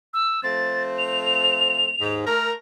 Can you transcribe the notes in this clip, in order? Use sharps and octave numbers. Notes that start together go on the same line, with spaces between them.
E6
F3 A3 C4 A6
F7
D#2 G#2
A3 A#4 F6